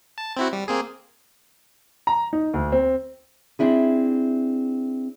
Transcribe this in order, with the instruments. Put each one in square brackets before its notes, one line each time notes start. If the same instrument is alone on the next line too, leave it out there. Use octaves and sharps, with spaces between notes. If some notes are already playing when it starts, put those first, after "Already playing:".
[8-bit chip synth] A5
C4 E4 F#4
G3
A#3 C4 G#4
[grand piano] A#5
D#4
D2
C4
[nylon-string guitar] C4 D4 E4 G#4